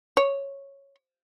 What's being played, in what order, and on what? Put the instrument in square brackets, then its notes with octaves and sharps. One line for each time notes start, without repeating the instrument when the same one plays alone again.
[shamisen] C#5